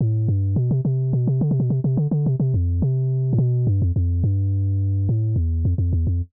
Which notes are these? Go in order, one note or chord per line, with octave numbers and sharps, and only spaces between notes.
A2
G2
B2
C3
C3
B2
C3
D3
C3
B2
C3
C3
D3
D3
C3
C3
F2
C3
A2
B2
G2
F2
F2
G2
A2
E2
F2
F2
E2
F2